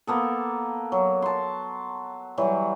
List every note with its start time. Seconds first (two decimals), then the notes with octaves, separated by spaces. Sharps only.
0.07 A#3 B3 A4
0.92 F#3
1.22 A5 C6
2.38 E3 F#3 G3